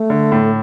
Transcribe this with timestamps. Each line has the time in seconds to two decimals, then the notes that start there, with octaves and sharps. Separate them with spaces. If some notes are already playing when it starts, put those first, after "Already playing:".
Already playing: A3
0.10 D3
0.32 A2